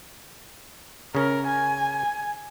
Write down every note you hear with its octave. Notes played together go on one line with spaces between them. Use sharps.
C#3 C#4 A#4
G#5